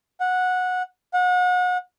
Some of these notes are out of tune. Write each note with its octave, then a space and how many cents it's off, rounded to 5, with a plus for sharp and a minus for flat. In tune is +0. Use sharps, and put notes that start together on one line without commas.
F#5 -15
F#5 -35